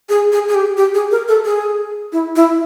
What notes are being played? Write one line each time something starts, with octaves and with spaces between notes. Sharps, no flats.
G#4
G#4
G#4
G4
G4
G#4
A#4
A4
G#4
E4
E4